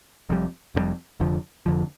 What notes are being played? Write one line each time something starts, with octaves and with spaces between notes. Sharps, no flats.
F1 F2 C3 G3
F1 F2 C3 G3
F1 F2 D3 F3
F1 F2 D3 F3